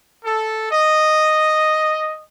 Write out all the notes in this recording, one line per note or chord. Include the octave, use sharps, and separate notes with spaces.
A4
D#5